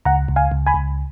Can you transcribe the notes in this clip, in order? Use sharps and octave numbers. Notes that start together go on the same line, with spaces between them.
C#2 F#5 A#5
C#2
F5 G#5
C#2
G#5 B5
C#2